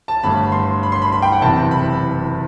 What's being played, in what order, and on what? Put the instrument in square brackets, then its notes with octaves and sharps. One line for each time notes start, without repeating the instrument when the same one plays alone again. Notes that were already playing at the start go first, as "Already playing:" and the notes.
[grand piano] A5
G1 G2 D3 A3 B5
C6
B5
C6
B5
B5
G5
F#5
F#1 E2 C3 A5
B5